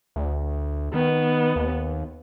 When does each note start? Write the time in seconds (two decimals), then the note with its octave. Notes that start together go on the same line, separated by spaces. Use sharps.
0.16 D2
0.94 D#3 B3
1.56 D#2